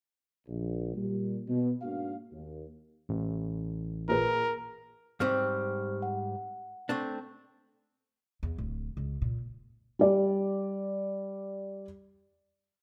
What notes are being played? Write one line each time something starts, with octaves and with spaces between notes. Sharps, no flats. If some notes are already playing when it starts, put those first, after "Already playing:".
A#1
A#2 G3
B2
G#2 A#3 D4 F#4 F5
D#2
A1
A#2 G#4 A#4 B4
G#2 G3 C4 C5 C#6 F6
F#5
A3 C4 D4
E2
D1
C#2
A#2
G3 D5